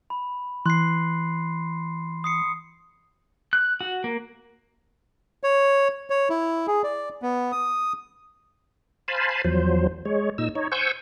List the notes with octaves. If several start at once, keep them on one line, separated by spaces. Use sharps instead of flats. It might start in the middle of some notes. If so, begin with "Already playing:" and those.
B5
E3 C6 F#6 C7
D#6 C7 C#7
F#6
F#4
A#3
C#5
C#5
E4
G#4
D5
B3
D#6
C5 F5 G#5 A5 B5
E2 F3 F#3 C5
G#3 C#5
A#2 D#4 E6
D#4 C#5
C5 F#5 G#5 C#6 E6 G6